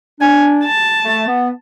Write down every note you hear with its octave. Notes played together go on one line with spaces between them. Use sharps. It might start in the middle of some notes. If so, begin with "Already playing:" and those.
D4 G#5
A5
A3
B3